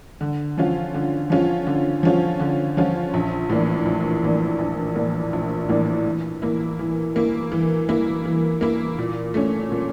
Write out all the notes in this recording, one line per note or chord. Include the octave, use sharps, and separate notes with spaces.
D3
F3 C#4 F4
D3
F3 C#4 F4
D3
F3 C#4 F4
D3
F3 C#4 F4
A#1
A2 E3 A#3 D4
A#1
A2 E3 A#3 D4
A#1
A2 E3 A#3 D4
A#1
A2 E3 A#3 D4
E3
A#3 E4
E3
A#3 E4
E3
A#3 E4
E3
A#3 E4
A#2
A3 C#4
A#2